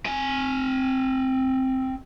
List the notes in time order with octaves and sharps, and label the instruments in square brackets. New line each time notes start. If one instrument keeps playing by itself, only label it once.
[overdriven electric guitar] C4 G#5